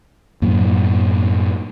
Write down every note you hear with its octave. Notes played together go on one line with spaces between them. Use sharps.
F#2 A2 F#3 A#3